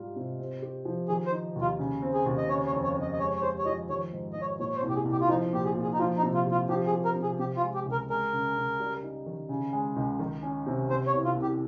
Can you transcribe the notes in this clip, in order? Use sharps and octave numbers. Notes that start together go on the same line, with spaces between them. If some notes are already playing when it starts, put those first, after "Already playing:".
Already playing: G#2 G3 F4
C3
C4
G4
F3
D#3 G#4
C5
D#4
D#2
F4
C#3
C4
G#4
D#2
D#5
C#3 C#5
C#5
F2
C#5
F2
D#5
D#5
G#3 C#5
C#5
G4 C5
C#5
F3 D#5
D#3 C#5
G#2
G#2 D#5
C#5
A#2 C#5
C#5
C5
C2
G4
G#4
C2
G4
F4
F3 D#4
A#2 G4
G#4
A#2
G#4
D#4
F3 F4
D#4
C3
F4
C3 F4
F3 G4
G#4
G4
A#4
C3
G#4
C3 G4
F4
G#3
G4
C#2
A#4
G#3 A#4
C#3
C#3
G3
D#4
D#3
C#3
G#3
C#2
D#3
C#4
C3
C3 C5
C#5
C2
F4
C2
G4